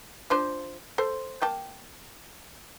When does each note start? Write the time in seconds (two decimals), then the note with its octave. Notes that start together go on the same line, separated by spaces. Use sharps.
0.30 F3 D4 C5
0.98 A4 C5
1.42 A#3 G5 A5